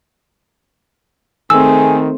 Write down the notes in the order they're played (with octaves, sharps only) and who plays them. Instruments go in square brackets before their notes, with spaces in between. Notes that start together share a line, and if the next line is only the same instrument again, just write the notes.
[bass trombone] D#3 [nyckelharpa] A3 C4 [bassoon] G#4 [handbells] E6